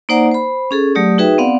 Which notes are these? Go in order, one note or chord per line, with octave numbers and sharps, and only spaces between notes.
A#3 D#4 C5 D5 F#5 A#5
C5 B5
C#4 G#4 A4
F#3 A3 G4 D5 D#6
D#4 F#4 G#4 B4 E5 G5
B3 C4 D5 F5 F#5